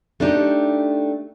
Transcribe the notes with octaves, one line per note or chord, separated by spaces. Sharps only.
A3 D4 D#4 G4